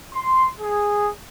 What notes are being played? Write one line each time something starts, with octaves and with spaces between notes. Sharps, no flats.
C6
G#4